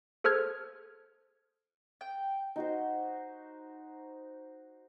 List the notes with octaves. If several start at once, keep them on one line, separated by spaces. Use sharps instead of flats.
G#4 A4 C5 F6 G#6
G5
D#4 F#4 C5